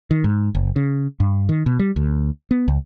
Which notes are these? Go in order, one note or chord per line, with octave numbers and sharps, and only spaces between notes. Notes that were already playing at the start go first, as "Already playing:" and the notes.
D#3
G#2
F#1
C#3
G2
D#3
B2
G3
D2
B3
C#2